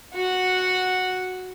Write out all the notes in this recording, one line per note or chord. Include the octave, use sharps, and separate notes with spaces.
F#4 F#5